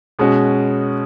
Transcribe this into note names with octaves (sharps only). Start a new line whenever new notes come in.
B2 G#3 C#4 F#4